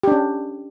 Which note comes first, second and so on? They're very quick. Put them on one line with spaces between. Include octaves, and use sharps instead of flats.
G4 D4 C#4